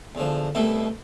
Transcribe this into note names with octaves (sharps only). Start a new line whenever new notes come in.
E2 D3 F3
C2 B2 A3 E4